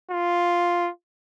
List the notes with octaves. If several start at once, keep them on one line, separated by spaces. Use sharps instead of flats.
F4